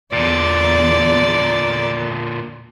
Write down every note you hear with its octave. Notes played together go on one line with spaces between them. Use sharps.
E2 A#2 D3 D5